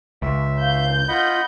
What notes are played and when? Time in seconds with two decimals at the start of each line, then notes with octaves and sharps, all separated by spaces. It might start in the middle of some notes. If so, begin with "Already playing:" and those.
0.22 C#2 E5
0.61 F5 G6
1.09 F4 D#5 F#5 B5